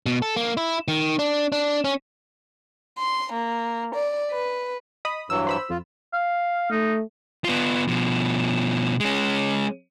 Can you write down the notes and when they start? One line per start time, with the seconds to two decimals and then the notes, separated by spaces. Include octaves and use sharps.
0.06 B2
0.22 A4
0.36 A#3
0.57 E4
0.88 D#3
1.19 D4
1.52 D4
1.84 C#4
2.98 C6
3.33 A#3
3.95 D5
4.32 B4
5.05 D#5 B5 D#6
5.30 G2 E3 F#3 E6
5.47 C5 B5 E6
5.70 F2 F4
6.13 F5
6.71 A3 D#4
7.44 B3 F4
7.88 B2 F3
9.00 G#3 C#4